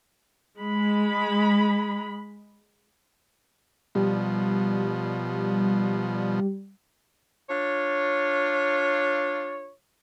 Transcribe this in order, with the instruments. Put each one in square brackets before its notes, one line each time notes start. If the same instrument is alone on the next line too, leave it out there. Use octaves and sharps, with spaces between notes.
[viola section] G#3 B5
[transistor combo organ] B2 F3 [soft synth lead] G3
[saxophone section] D4 F4 C#5